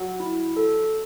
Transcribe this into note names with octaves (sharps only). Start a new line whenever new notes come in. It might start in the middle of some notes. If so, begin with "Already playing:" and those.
Already playing: F#3
E4
A4